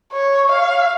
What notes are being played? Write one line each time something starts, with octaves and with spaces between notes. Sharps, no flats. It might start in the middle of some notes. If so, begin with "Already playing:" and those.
C#5
F5